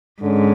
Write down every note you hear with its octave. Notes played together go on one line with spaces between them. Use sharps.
G#2 D3 G#3 C#4